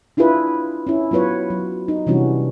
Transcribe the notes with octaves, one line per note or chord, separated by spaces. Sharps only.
D4 E4 F4 G#4 B4
C#4 E4
F#3 B3 F4 B4 C#5
F#3
D#4
C3 E3 G3 C#4 D4 F#4